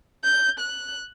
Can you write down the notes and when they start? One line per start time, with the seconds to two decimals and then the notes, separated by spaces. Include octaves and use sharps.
0.24 G6
0.59 F#6